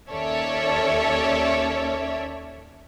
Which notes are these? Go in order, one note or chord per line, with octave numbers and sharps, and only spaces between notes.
D#2 C#4 A4 C#5 D5 E5